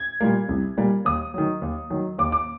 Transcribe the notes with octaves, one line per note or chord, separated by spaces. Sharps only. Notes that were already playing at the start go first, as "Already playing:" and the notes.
Already playing: G#6
A#2 G3 A#3
C2
A#2 G3 A#3
D#2 D#6
D#3 F#3
D#2
D#3 F#3
D#2 D6
D6